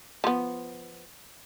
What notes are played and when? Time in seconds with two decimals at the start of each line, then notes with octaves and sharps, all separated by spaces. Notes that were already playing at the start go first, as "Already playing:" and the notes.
0.24 F3 B3